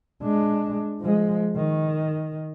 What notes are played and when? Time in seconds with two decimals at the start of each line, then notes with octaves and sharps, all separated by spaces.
0.23 G#3 D4
1.01 F3 G#3
1.56 D#3